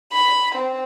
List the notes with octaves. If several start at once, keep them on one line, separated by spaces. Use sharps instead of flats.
B5
C4